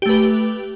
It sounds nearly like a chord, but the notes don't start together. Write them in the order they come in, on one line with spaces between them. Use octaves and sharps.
G4 A3 B4